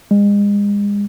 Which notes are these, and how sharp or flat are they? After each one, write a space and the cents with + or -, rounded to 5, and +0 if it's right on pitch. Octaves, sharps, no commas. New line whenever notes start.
G#3 -35